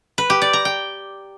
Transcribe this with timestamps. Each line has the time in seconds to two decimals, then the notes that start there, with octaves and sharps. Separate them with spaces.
0.18 B4
0.30 G4
0.42 D5
0.53 A#5
0.65 G5